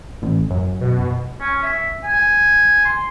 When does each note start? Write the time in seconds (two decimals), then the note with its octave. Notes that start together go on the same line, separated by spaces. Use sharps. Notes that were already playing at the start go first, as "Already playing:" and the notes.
0.22 A1
0.51 F#2
0.81 B2
1.40 C#4
1.63 E5
2.04 G#5
2.85 C6